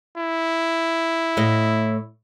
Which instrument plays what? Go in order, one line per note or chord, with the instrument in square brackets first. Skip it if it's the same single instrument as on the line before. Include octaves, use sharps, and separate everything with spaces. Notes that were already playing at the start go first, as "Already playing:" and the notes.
[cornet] E4
[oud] A2 D#5